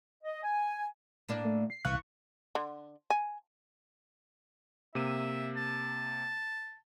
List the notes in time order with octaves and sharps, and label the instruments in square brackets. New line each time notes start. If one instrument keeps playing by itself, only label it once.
[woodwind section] D#5
G#5
[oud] A2 A#3 D4
[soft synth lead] A3
C7
[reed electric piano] C2 F5 F#6 [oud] E3 [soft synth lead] C#6
[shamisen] D3
G#5
[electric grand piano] C3 A#3 D#7 [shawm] E5
[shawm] A5